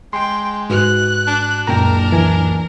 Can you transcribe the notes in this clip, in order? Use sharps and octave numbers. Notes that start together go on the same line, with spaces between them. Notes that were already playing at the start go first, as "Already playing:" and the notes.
G#3 G5 C6
G#2 F#4 B4 F#6
D4
F#1 C#2 A#2 A#4 G5 A#5
E3 G#5